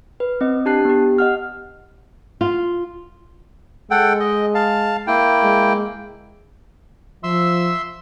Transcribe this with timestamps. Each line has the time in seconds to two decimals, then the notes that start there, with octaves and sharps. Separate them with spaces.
0.20 B4
0.41 C4 D#5
0.65 D4 G4 A5 F#6 C7
0.85 B3 G4
1.18 D#5 F#5 F6
2.41 F4
3.91 G#3 A4 F#5 G5
4.20 D#5
4.55 F5 A5
5.07 A#3 E4 G5
5.43 G#3
7.23 F3 E5 C6 E6